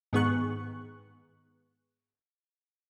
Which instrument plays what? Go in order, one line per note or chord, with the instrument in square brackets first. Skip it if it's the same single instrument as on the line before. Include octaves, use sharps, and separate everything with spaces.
[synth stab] G#2 D#3 B3 G#4 C#6 F#6